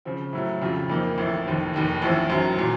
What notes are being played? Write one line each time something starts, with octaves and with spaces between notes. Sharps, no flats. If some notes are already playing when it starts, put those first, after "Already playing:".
C#3 F3 C4
A2 F#3 A3
F2 C#3 F3 C4 F4
F2 D#3 A#3 D#4
A1 A2 F3 A3
F1 D#2 D#3
F1 D#2 D#3
A1 A2 F3 A3 C4
F#2 D#3 F#3
A#2 F#3